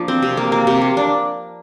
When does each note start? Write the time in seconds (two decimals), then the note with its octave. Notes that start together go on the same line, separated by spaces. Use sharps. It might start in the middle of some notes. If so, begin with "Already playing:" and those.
Already playing: F3 A#3 D4
0.08 C4
0.23 C3
0.37 A#3
0.52 A#3
0.67 C3
0.81 A#3
0.97 D4